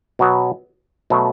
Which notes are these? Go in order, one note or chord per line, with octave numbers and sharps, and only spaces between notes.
B2 F#3 B3
B2 F#3 A3